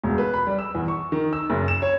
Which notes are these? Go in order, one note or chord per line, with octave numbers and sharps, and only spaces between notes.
E1
B4
B5
G3
E6
E2
C#6
D#3
E6
F#1
E7
C#5